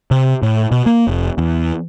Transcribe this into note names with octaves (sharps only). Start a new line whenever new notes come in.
C3
A2
B2
A#3
F1
E2